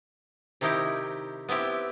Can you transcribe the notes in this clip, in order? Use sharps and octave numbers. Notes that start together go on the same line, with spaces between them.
C3 D#3 D#4 E4 G4
B3 C4 E4 G4